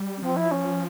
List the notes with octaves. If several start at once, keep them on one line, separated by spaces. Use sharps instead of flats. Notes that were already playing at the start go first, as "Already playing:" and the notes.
Already playing: G3
C#4
F3 C4
E4
C#4